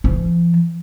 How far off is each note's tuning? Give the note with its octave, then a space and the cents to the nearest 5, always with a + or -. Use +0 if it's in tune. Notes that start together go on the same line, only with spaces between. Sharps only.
F3 -40